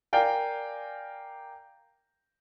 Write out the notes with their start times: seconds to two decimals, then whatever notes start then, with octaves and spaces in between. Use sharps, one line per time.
0.13 A#4 D5 F5 G5 G#5